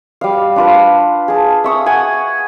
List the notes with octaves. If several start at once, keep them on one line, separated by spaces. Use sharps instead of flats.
G3 F5
D4 F4 B4
G#4 A5
E5 C#6 D#6
F#5 G#5